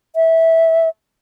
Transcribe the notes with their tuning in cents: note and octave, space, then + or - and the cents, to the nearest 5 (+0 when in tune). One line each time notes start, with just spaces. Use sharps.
E5 -15